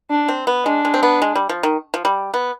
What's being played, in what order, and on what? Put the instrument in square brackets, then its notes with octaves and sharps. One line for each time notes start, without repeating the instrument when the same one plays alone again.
[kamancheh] D4
[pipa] C4
B3
[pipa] G#3 [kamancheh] D4
[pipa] G#3
C4
B3
G#3
G3
F3
D#3
F3
G3
B3